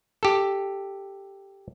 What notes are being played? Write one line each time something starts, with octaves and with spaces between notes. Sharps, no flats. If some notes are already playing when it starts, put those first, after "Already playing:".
G4 A4